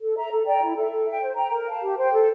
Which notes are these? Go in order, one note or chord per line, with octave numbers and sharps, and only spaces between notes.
A4
E5 A#5
A4
D5 G5 A#5
E4
A4 E5
A4
E5 G5
C5
G5 A#5
A#4
F5 A5
G4
C5 G5
A4